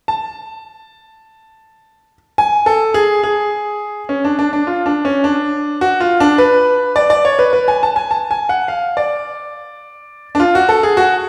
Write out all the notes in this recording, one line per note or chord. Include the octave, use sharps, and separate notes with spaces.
A5
G#5
A4
G#4
G#4
C#4
D4
D4
D4
F4
D4
C#4
D4
F#4
F4
D4
B4
D5
D5
C#5
B4
B4
G#5
A5
G#5
A5
G#5
F#5
F5
D5
D4
F4
F#4
A4
G#4
F#4